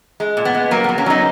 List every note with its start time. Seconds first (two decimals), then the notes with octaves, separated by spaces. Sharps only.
0.20 G#3
0.37 A#2
0.45 B3
0.55 G#3
0.71 F#3 A#3
0.84 F#3 B3
0.98 A#3 C#4
1.06 F#3 B3 D#4